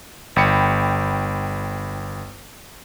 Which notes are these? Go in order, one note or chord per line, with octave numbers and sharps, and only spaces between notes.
G1 G5 B5 C#7